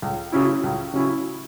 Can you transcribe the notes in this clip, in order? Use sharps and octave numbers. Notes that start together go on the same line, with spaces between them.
C#2
C#3 F#3 C#4 E4
C#2
C#3 F#3 C#4 E4